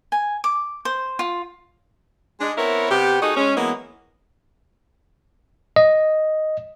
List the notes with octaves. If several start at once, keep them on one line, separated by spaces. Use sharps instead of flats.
G#5
D6
C5
F4
G#3 D4
B3 C4 E4 A#4 C#5
C3 B3 G4
A3 D#4 F#4 G#4 D#5
G#3 C#4
E3 F#3 G#3 A#3 B3
D#5